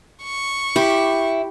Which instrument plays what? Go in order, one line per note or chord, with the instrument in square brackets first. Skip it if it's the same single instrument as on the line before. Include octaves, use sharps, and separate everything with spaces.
[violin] C#6
[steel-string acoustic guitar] E4 [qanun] G4